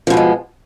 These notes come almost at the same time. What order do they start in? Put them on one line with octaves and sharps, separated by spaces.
F3 B2 A3 G#3